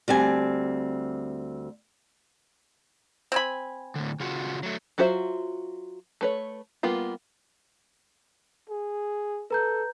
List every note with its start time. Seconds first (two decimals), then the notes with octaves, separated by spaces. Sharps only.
0.08 D2 G3 C4 G#5
3.32 C4 G#5 B5
3.95 A2 D3
4.20 C#3 F4 F#4
4.63 F#3 A3
4.98 F#3 F4 F#4 C5 E5
6.21 A3 B4 C#5
6.83 G3 A#3 B3 F4
8.69 G#4
9.51 A4 B4 A#5 G6